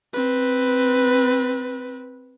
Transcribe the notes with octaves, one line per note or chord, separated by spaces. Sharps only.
C4 B4